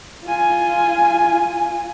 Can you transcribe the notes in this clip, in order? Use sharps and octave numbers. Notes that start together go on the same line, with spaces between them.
F4 G#5